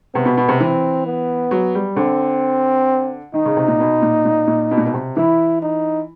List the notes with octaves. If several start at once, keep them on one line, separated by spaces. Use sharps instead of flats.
C3 B3
B2
B2
C3
E3 C4
B3
F#3
G3
D3 C4
D#3 D#4
C#3
C3
A#2
B2
A#2
A#2
A#2
B2
A#2
B2
C3
E3 E4
D#4